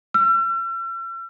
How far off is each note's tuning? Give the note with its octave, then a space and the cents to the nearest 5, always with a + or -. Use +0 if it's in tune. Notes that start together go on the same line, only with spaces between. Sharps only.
E6 +45